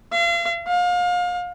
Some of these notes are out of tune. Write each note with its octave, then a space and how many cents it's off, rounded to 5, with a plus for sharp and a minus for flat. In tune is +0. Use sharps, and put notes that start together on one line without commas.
F5 -40
F5 +30